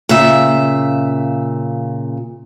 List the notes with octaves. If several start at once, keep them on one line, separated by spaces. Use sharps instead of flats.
A#2 C#3 E5